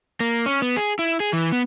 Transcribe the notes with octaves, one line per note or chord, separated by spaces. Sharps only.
A#3
C#4
B3
G#4
E4
G#4
E3
B3